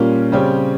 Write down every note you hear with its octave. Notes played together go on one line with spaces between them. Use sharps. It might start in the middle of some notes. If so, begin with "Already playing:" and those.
Already playing: A#2 G3 A#3 C#4 F4
C#3 G3 C4 G4 C#5